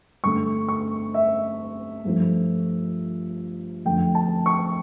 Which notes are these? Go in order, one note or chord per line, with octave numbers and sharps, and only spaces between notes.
G2 D3 A3 C#6
C#6
E5
G2 F3 A3
F2 D3 A3 G5
A5
C#6